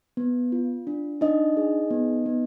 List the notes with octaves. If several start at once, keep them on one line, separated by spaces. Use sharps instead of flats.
B3
F4
D4
D4 D#4 D#5
G#4
B3
B3